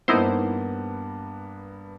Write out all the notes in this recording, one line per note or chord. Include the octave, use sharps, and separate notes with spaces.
G2 A#3 B3 D#4 E4 C5